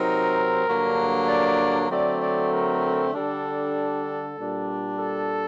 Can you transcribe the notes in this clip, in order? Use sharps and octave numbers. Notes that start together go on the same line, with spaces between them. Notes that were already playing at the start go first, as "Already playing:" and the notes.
Already playing: C3 F#3 C4 D#4 A#4
G2 D3 F#3 A#3 D4
D5
D3 F#3 A3 C4 D5
D5
A#4
D3 G3 D4 A4
A#2 G3 D4
A4